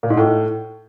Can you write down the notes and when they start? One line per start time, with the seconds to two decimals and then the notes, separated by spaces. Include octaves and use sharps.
0.03 A#2
0.10 G#2
0.17 A2